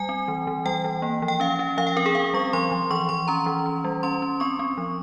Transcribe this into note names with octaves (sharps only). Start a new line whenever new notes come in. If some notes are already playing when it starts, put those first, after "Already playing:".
Already playing: G3 G#5
C4
E3
E3
G3 G5
E3
A#3
F3
G5
C#4 F5
C#4
F3 F5
G5
C4 A#4
G#4
C4 F5
G3 C#6
F3 C6
F3
E3 C#6
E3 C6
C#4 A#5
E3
C#4
G3
C#4 C6
C#4
C4 C#6
C4
F3